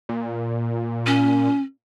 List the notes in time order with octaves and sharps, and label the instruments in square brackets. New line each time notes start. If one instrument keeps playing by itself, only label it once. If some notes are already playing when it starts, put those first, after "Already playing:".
[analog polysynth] A#2
[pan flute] C#4